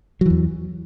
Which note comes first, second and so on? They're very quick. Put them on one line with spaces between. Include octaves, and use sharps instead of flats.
F#3 E3 E2